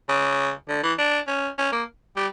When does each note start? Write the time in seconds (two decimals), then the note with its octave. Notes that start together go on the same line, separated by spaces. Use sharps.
0.09 C#3
0.69 D3
0.83 E3
0.99 D4
1.28 C#4
1.59 C#4
1.72 A#3
2.17 G3